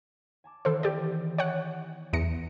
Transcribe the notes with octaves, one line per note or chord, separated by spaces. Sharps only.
G#5 A5 D6
D#3 E3 B3 A4 C5
G4 D5
C#5 F#5
E2 A#6 C#7